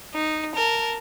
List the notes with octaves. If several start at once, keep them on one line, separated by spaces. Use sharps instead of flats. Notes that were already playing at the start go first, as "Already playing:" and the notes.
D#4
A#4 A5